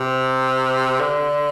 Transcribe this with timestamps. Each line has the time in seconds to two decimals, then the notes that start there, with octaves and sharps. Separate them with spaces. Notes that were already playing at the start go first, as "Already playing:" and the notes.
Already playing: C3
1.00 D3